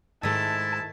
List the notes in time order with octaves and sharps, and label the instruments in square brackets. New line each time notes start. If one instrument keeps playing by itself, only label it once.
[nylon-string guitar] G#2 G#3 [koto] D#3 A3 [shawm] E4 [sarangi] A5